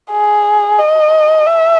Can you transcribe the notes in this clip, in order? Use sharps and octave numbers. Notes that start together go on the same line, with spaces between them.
G#4
D#5
E5